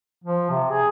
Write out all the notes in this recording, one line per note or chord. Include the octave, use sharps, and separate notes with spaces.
F3
C3
G#4